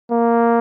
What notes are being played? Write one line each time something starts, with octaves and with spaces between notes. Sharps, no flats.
A#3